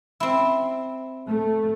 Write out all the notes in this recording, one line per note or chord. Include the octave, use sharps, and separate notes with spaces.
C4 E4
A3